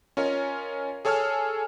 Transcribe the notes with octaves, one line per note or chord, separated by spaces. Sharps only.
C#4 F4 A#4 C#5 D#5
G#4 A4 C#5 G#5 E6 F6